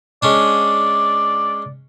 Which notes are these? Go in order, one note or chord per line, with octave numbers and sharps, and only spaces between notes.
G#3 C#4 D4 D5